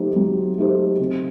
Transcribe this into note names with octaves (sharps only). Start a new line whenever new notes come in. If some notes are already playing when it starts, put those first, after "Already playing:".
Already playing: F#3 A3 D#4 G4 C5
F#3
A3 D#4 G4 C5
C3